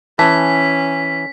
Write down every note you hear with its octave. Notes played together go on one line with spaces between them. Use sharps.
E3 C#4 A5 B6